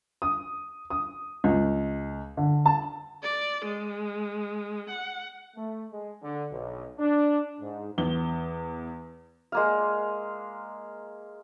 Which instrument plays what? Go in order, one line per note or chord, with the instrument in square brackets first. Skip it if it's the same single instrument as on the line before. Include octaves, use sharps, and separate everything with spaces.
[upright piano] D#6
D#6
C#2
D3
A5
[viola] D5
G#3
F#5
[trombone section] A3
G#3
D3
B1
D4
G#2
[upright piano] E2 G7
[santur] G#3 A#3 F5